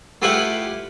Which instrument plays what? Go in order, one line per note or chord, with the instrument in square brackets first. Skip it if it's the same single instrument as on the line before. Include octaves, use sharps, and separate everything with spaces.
[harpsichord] A3 E4 F4 G4 B4 F#5